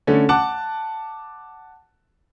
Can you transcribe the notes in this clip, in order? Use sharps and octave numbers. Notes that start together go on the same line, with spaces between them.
D3 A3 C#4
F#5 A5 D6 F#6